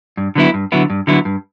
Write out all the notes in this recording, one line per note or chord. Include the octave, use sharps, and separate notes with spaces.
G2
D3 F#3 B3 E4
G2
D3 F#3 B3 E4
G2
D3 F#3 B3 E4
G2